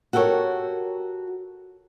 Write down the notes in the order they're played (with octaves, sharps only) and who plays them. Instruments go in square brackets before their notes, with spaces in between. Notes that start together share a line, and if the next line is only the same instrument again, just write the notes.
[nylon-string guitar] F#4 G4 A4 A#4 C#5